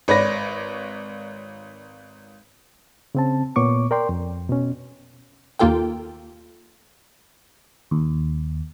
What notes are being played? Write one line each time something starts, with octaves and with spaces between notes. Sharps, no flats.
G#1 B4 C#5 D5 A#6
C#3 C4 A5
A#2 B3 C#5 C#6 D6
A#4 D5 G5 C6
F2
B2 C#4
D#2 A#3 F4 A4 G5
D#2